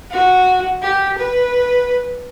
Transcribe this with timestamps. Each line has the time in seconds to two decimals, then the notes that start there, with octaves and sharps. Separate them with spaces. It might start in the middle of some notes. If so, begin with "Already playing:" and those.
0.11 F#4
0.82 G4
1.18 B4